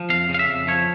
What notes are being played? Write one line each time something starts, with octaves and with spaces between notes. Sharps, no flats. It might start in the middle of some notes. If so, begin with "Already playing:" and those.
Already playing: F3
F2 F5
C#3
F5
E5
F2
F3 C#5